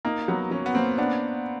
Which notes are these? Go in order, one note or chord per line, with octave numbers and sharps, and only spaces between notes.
A#3 D#4
F#3 B3
F#3 C#4
B3
A#3 C4
B3 D4